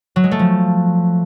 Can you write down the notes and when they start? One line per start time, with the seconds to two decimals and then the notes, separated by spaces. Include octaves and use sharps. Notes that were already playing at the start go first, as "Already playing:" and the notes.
0.16 F#3
0.24 G#3
0.31 A3
0.39 F3